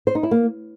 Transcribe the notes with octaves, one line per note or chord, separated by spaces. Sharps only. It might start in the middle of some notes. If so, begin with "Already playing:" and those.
C5
D#4
E4
A#3